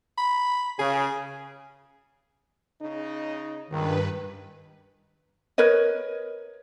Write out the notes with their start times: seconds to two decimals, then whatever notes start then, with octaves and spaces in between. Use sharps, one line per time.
0.18 B5
0.79 C#3 G#4
2.81 C#3 D#4
3.70 C#2 G2 D#3 B4
5.58 A#4 B4 C#5 D#5